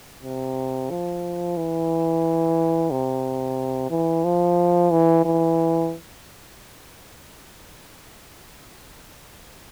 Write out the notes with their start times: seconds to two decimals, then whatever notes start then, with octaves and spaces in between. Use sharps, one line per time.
0.23 C3
0.90 F3
1.57 E3
2.91 C3
3.91 E3
4.24 F3
4.91 E3
5.25 E3